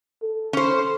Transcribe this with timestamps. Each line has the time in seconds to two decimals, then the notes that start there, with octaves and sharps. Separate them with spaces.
0.23 A4
0.53 C#4 C5